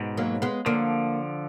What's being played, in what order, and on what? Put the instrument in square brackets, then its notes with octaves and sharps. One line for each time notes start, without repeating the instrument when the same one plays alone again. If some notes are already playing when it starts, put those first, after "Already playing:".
Already playing: [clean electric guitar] G#2 B2
[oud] F#3 A#3
G#3 B3
[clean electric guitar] D3 F3 [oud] A#3 D4